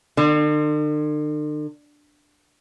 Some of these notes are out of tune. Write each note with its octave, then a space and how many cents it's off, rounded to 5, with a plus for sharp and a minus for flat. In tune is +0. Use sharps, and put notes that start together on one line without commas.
D3 +45